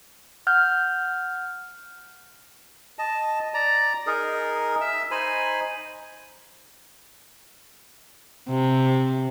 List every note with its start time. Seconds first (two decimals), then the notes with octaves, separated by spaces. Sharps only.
0.47 F#5 F6 G6
2.99 D#5 A5
3.54 D5 A#5
4.07 D#4 G#4 A#4
4.81 E5 E6
5.11 D#4 C5 G#5 B5
8.49 C3